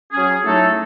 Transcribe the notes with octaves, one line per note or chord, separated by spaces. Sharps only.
F#3 C#4 G#4
A2 F#3 A3 D#4 A4